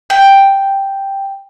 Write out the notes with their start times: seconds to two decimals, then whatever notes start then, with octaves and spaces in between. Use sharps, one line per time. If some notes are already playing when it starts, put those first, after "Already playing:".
0.10 G5